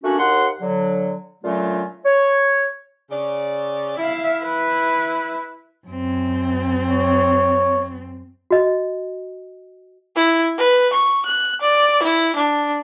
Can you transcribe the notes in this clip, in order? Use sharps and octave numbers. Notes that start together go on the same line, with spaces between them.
A3 A#3 C#4 D4 F#4
D#2 F#5 C6
D3 F#3
A#2 D3 F#3 A3 C#4 F4
C#5
C#3 D5
E4 E5 F5
B4
F#2 C4
C#5
F#4 D#5
E4
B4
C#6
F#6
D5
E4
D4